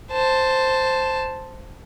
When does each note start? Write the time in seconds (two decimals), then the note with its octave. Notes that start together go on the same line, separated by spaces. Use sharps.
0.12 C5 A5